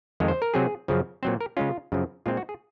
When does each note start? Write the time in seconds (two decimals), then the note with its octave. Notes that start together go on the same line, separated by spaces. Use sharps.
0.20 F2 D#3 G#3
0.28 C5
0.42 A#4
0.54 C3 F#3 C4 G#4
0.88 F#2 C#3 F3
1.23 A#2 F#3 C4 C5
1.41 A#4
1.57 C#3 G#3 C#4 F4
1.92 F#2 C#3 F3
2.26 A#2 G#3 C4 F4
2.37 F#4
2.49 G#4